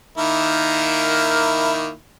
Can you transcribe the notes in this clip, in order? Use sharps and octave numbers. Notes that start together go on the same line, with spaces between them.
D#3 A#3 E4